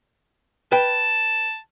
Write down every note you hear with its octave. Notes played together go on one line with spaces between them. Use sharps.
B4 G5 A5